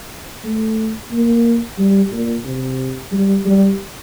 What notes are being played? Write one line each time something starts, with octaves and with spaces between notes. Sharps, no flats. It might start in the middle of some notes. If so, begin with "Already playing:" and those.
A3
A#3
G3
A#2
C3
G3
G3